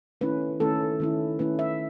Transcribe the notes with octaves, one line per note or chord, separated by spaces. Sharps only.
D#3 A3 C#4 E4 B4
D#3 A3 C#4 E4 A4
D#3 A3 C#4 E4
D#3 A3 C#4 E4 B4
E5